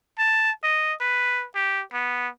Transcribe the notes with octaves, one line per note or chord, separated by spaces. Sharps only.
A5
D#5
B4
G4
B3